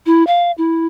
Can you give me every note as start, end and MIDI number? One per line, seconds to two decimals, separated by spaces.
0.06 0.25 64
0.27 0.51 77
0.58 0.87 64